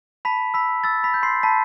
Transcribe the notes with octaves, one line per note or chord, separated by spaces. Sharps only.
A5 B5 B6
B5 E6 B6
E6 A6
B5 B6
G6
C6 C7
A5 B5 B6